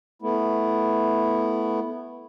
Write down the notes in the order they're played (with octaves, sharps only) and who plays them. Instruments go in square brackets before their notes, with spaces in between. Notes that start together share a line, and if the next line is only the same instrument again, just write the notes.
[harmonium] A3 B3 E4